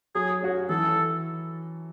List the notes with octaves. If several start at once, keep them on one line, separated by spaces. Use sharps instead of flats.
F#3 G#4
C#4 F#4
E3 A4